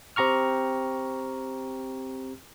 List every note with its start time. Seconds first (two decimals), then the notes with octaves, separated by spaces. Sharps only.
0.16 C4 G4 A#5 C#6 F6